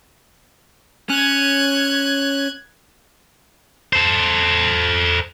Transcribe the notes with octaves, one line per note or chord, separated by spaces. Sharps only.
C#4 F#6 G#6
A4 C5